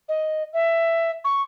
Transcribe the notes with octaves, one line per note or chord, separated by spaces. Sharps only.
D#5
E5
C#6